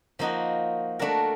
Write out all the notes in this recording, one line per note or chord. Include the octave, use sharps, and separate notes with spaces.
F3 A#3 D#4 F#4
A3 D4 F#4 A#4